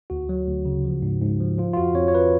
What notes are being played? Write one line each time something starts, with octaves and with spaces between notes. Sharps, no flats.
D2 F#4
F#3
D2
C#3
F3
G#2
G#2
F3
F3 F4
F4
F2 F#4
F2 C#5
C#5
F3 B4